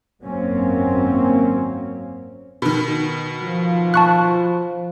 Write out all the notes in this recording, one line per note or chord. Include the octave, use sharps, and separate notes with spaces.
G#1 F#2 F#3 A#3 C4 C#4
B2 D#3
F3
A5 C#6 F#6